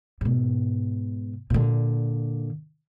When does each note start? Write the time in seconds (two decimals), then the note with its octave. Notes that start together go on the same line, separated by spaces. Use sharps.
0.21 G#2 B2
1.50 A#2 D3